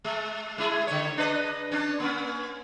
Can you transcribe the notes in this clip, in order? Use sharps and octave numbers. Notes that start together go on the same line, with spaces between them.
G#3
G#3 E4 G#4
D3 C#5
D4 B4 D#5
C#4 D4
A#3 C#4